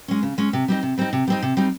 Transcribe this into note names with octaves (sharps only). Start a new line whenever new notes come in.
G#3 C#4
C#3
G#3 C#4
C3
G3 C4 D#4
C3
G3 C4 D#4
C3
G3 C4 D#4
C3
G3 C4 D#4